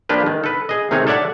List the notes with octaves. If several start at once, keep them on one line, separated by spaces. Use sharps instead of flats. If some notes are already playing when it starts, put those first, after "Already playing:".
F3 A#3 D4 G4 B4
D#3
A4 B4
G#4 D#5
C3 D#3 A3 D#4 G#4 C#5
A4 C#5 D5 E5 F#5 A5